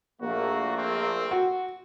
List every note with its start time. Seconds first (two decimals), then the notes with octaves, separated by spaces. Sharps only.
0.22 A#1 A3 A#3 F#4
0.77 C4
1.31 F#4